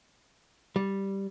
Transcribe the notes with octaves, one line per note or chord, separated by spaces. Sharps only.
G3